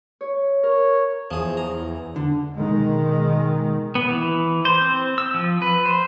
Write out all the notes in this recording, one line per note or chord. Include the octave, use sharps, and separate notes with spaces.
C#5
A#4 C#5
E2 F3 G#4
A#5
D3
B2 D#3 G#3
B3
E3
C5
C4
E6
F3
B4
C5